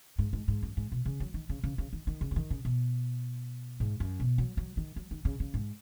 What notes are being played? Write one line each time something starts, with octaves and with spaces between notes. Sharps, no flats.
G#2
G#2
G#2
F#2
G#2
B2
C#3
F#3
D#3
C#3
C#3
C#3
D#3
D#3
C#3
F#3
D#3
C#3
B2
G#2
F#2
B2
F#3
F#3
D#3
F#3
D#3
C#3
C#3
G#2